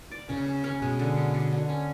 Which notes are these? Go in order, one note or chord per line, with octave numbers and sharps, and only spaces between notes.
D5
C#3 C#4
C#4
C#4
B2 G#3
D3
C#4
D3
D3
C#4